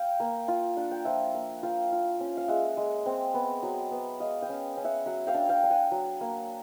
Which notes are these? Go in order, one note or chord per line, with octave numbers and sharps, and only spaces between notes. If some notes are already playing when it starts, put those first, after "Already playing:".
Already playing: F5 G5
A#3
F4
D4 F#5
G5
F3 E5 F#5
A#3
F4 F5 G5
F4
C#4
F5
G#3 E5 F#5
G#3
C4
B3
F#3
B3
G#3 D#5 F5
F5 G5
C#4
C#4
E5 F#5
F#3 E5 F#5
F5 G5
D4
F5 G5
D4
F#5 G#5
F#3
A#3